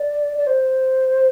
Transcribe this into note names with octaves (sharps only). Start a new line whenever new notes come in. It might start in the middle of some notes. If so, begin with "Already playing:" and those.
Already playing: D5
D5
C5